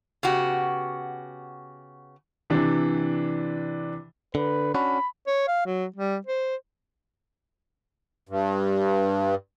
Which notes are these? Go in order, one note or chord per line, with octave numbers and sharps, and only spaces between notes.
C#3 B3 F#4 G4
C3 E3 D4
D3 B4
C#4 D4 F#4 B5
C#5
F5
F#3
G3
C5
G2